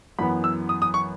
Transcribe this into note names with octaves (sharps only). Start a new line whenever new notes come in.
F#2 E3 B3 B5
E6
D#6
D#6
C#6